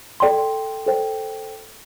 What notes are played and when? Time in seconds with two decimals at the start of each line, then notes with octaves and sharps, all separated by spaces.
0.20 A4 D5 G5 C6
0.87 A4 C5 G5